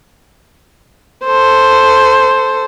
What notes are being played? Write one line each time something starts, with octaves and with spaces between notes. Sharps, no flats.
A4 C5